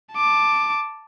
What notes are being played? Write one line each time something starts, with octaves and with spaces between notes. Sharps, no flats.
A5 D6